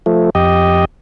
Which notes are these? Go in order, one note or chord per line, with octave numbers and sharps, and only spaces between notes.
F3 A3
F2 G4 D#5